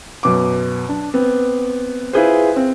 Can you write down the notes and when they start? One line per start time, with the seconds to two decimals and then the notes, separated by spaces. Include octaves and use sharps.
0.23 F#2 B2 D6
0.89 D4
1.14 B3 C4
2.13 E4 F4 G#4 B4 C5
2.56 C4